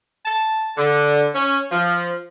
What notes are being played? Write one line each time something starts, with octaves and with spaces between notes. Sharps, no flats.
A5
D3
C#4
F3